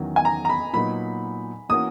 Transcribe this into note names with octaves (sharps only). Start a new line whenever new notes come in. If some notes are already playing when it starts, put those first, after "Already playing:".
Already playing: E2 D#3 F#3 C#4
G#5
A#5
A#5
B5
A#2 F#3 B3 D#4 B5
E3 A#3 C#4 F#4 D#6